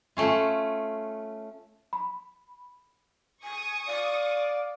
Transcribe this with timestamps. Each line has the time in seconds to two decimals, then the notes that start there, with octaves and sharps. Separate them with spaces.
0.17 A3 C#4 F4
1.93 B5
3.43 G#5 C#6 D#6
3.88 D5 F5